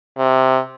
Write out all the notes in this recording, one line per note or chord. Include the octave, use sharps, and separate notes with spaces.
C3